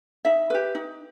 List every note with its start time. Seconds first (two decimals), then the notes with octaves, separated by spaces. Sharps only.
0.25 D#4 E5
0.50 G4 B4
0.75 D#4